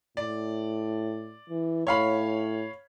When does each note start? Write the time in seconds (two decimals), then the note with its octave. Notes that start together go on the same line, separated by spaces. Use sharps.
0.17 A2 D5
1.50 E3
1.87 A2 C#5 F5 B5